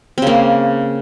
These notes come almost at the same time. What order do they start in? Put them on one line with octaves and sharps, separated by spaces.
C4 C#3 A#3